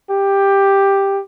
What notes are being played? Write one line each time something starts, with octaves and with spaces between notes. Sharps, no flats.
G4